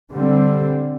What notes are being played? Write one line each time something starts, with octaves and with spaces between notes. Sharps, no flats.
D3 G3 C4